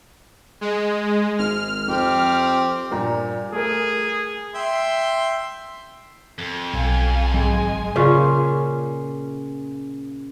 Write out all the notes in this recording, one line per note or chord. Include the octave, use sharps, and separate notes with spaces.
G#3
G#1 F6
F2 C4 G4
G2 A#2 A#5
A3 G#4 A#4
E5 G5 C6
F2
B1 F5 G#5
G#1 F#3 G#3 C4 G#5
A#2 C#3 C#4 F4